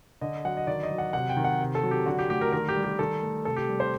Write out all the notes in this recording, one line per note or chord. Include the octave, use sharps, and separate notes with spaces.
D3 D#5
F#3 F#5
D#5
D#3 D5
D#5
F#3
F#5
C3 F#5
G5
D#3
F#5
C3
A4
F#3
G4
D3 F#4
G4
A3 G4
A#4
D#3 A#4
G4
G3
G4
D#3 A4
A3
C3 A4
G4
G3
C5